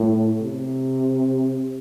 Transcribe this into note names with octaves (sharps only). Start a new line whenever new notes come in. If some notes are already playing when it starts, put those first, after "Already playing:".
Already playing: A2
C3